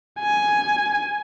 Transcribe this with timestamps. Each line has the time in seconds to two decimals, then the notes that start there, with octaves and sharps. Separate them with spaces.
0.20 G#5